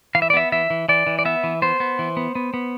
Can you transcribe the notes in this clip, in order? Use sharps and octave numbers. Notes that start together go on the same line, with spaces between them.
E3 F5
E5
D5
B3 E5
E3 E5
E3
E3 D5
E3
D5
B3 E5
E3
B3 C5
B3
E3
B3
B3
B3